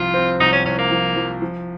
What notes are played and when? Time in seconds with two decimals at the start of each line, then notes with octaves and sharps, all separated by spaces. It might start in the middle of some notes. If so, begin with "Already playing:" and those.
Already playing: C2 F3 C4 F4
0.14 C4
0.40 C2 D#4
0.52 C#4
0.65 C2 C#4
0.78 A#3
0.91 F3
1.16 F3
1.42 F3